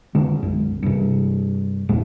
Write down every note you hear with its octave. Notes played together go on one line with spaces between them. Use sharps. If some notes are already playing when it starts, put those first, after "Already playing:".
D3 G#3
B1 F#2
G2 C3
G#1 E2 A#2 G#3